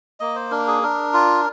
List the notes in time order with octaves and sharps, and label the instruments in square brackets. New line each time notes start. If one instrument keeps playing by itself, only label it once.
[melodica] A#3 D#5
C5
D4 A#4
G#4
D4 A#4
F4